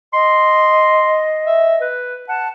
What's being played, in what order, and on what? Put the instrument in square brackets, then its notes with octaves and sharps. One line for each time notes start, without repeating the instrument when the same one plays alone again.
[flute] D#5 [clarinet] C6
[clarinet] E5
B4
[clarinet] F#5 [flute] A5